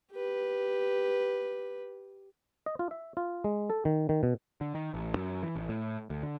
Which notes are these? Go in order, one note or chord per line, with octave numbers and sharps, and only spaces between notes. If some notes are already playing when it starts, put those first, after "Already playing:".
G4 B4
D#5
F4
E5
F4
G#3
A4
D#3
D#3
B2
D3
D#3
A1
F#2
E3
A1
A2
D2
D3